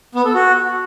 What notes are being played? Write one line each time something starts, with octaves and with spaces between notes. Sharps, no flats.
B3
A4
F#4